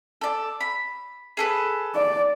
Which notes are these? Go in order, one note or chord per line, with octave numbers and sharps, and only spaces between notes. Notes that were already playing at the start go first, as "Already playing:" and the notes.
A4 D5
B5
G#4 A4 B4
D5